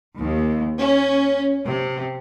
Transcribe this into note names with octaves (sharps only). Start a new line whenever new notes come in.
D#2
C#4
C3